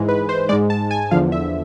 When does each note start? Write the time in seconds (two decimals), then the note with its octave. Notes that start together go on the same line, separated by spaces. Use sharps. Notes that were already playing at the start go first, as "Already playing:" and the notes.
Already playing: G#2 E3 G#3
0.08 B4
0.29 C5
0.49 G#2 G#3 D5
0.70 A5
0.91 G#5
1.11 E2 D3 F3 F5
1.32 E5